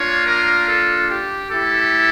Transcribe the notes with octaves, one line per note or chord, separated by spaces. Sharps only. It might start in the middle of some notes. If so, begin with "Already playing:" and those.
Already playing: A#3 D4 F4 C#5
A#4
A4
G4
A3 E4 G4 A4